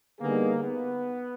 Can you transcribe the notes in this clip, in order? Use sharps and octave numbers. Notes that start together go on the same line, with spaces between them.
D3 G3 A#3 B3 D#4 G#4
B3